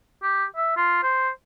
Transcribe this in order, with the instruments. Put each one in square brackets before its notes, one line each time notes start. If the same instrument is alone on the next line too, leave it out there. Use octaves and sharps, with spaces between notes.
[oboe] G4
E5
F4
C5